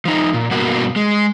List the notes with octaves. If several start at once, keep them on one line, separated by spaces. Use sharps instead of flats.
F3 D#4
A#2
G2 B2 A#3 F#4
G#3